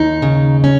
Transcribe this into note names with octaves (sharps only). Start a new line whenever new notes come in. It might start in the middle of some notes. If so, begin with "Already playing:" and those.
Already playing: D#2 D#4
C#3
C#4